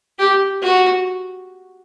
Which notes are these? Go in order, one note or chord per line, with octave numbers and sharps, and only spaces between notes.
G4
F#4